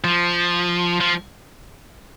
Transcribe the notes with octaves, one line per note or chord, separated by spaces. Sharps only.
F3
F3